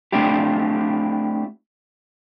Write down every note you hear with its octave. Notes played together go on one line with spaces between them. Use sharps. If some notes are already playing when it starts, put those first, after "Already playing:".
A3 C4 D4 E4 G4